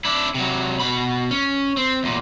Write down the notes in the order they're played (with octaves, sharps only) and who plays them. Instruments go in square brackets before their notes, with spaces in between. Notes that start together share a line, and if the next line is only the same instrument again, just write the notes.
[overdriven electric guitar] D4 E4
C3 F#3
B2 B5
C#4
C4
E2 A#2